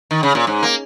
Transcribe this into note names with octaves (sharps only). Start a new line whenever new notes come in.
D#3
C#3
A#2
G#2
A#3